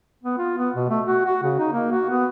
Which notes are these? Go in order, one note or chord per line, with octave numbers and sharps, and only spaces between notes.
B3
F4
B3
B2
A3
F#4
F#4
C#3
D#4
A#3
F#4
B3